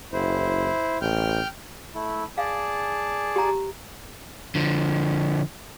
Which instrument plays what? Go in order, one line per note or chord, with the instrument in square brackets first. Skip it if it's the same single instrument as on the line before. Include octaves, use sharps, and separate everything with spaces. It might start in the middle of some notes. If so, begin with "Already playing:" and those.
[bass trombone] F#1 [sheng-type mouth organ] E4 C5
[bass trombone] A1 [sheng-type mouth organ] G5 F6 G6
[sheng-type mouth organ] A3 E4
[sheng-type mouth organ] G#4 D5 A5 [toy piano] F5
[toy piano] G4 A#5
[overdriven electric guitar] D3 F3